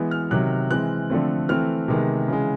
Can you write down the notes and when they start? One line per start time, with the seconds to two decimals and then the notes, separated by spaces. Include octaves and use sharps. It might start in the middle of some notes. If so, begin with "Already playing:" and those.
Already playing: E3 G#3 B3
0.11 F6
0.31 C3 D#3 F#3 F#6
0.70 E3 G#3 C4 F#6
1.10 D3 F3 A3 C4
1.49 E3 A3 C4 F6
1.88 C3 D#3 G#3 B3
2.28 C#3 E3 G#3